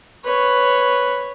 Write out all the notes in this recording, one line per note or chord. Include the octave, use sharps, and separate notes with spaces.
B4 C#5